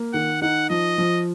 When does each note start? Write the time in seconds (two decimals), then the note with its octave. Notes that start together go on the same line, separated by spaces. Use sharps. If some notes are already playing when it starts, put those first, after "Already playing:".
Already playing: A#3
0.13 D#3 F#5
0.42 D#4 F#5
0.70 F3 D#5
0.98 F3